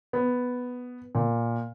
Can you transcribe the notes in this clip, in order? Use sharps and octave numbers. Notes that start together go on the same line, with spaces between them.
B3
A#2